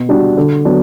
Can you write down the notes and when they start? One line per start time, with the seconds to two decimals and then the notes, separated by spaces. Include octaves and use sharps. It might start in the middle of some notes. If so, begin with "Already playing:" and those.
Already playing: B2
0.09 G3 D4 F#4
0.37 D3
0.65 F#3 B3 D4 F#4